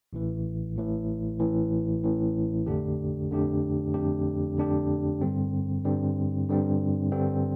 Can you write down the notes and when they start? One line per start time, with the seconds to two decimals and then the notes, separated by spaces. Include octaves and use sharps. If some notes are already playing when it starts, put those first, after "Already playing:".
0.13 A1 A2 E3
0.76 A1 A2 E3
1.39 A1 A2 E3
2.03 A1 A2 E3
2.66 F2 D3 A3 D4 G4
3.31 F2 D3 A3 D4 G4
3.94 F2 D3 A3 D4 G4
4.57 F2 D3 A3 D4 G4
5.21 G2 D3 G3 C4
5.85 G2 D3 G3 C4
6.49 G2 D3 G3 C4
7.12 G2 D3 G3 C4